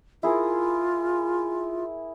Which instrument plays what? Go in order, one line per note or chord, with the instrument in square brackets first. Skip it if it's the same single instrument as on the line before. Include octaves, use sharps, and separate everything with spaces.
[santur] E4 G#4 A#4 [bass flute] F4